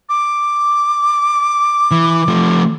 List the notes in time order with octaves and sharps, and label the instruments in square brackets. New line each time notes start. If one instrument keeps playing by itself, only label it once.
[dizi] D6
[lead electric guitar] E3
F3 A3